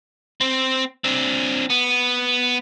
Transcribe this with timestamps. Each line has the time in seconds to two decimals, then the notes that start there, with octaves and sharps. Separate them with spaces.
0.41 C4
1.04 C4 D4
1.70 B3